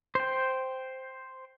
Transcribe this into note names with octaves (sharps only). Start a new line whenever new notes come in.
C5 G5